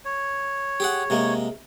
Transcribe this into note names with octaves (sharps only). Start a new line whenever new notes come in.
C#5
G4 G#4 F#5
C3 G#3 A#3